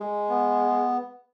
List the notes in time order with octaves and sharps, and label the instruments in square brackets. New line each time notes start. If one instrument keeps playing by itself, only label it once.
[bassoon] G#3
[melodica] B3